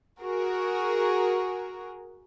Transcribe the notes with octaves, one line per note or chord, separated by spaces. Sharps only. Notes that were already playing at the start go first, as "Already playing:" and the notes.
F#4 G#4 A#4